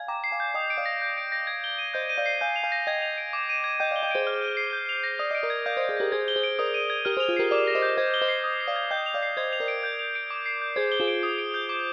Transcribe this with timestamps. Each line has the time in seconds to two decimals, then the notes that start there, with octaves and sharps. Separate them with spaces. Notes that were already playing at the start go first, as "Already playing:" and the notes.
Already playing: D5 F5 G#5 G#6
0.08 G5 A#5 D6
0.24 C7
0.32 F5 G#5
0.40 G6
0.54 D#5 G5 D#6
0.70 D7
0.78 D5 F5
0.86 A#6
1.02 G6
1.17 D7
1.32 A#6
1.47 G#6
1.64 G7
1.79 D#7
1.94 C5 D#5 G6
2.09 D#7
2.18 D5 F5
2.26 C7
2.41 F5 G#5 G6
2.56 F7
2.63 F5 G#5
2.72 A#6
2.87 D#5 G5 G#6
3.02 F7
3.17 D7
3.33 D6
3.49 D#7
3.64 G#6
3.80 D#5 G5 G6
3.91 D5 F5
3.96 G7
4.03 D#5 G5
4.11 G#4 C5 D7
4.27 F6
4.41 D#7
4.57 C7
4.73 G6
4.89 F7
5.04 A#6
5.19 D5 D#6
5.31 D#5 D7
5.43 A#4 D5
5.50 G#6
5.66 D5 F5 G6
5.77 C5 D#5
5.81 D7
5.89 G#4 C5
5.97 G4 A#4 A#6
6.12 G#4 C5 G#6
6.28 G7
6.36 G#4 C5
6.43 D7
6.59 A#4 D5 D#6
6.74 D#7
6.90 G#6
7.05 G4 A#4 F6
7.17 G#4 C5
7.20 F7
7.29 F4 G#4
7.37 G4 A#4 C7
7.51 A#4 D5 D6
7.67 A#6
7.75 C5 D#5
7.82 G6
7.97 C5 D#5 G#6
8.14 G7
8.22 C5 D#5
8.28 C7
8.44 D#6
8.61 C7
8.67 D5 F5
8.76 G#6
8.91 D#5 G5 G6
9.06 F7
9.14 D5 F5
9.23 C7
9.37 C5 D#5 G#6
9.53 F7
9.60 A#4 D5
9.68 D7
9.83 G6
9.99 F7
10.15 D7
10.30 D6
10.46 C7
10.62 G6
10.76 G#4 C5 G#6
10.92 G7
11.00 F4 G#4
11.08 D7
11.23 D#6
11.38 D7
11.54 G6
11.69 D6